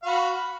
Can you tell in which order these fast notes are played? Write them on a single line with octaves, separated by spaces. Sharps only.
F5 F#4 B5